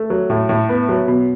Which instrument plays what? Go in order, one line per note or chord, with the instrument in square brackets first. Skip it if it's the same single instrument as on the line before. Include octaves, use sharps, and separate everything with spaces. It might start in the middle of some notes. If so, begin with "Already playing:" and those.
Already playing: [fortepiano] A3
F#3
A2
A2
B3
F#3
B2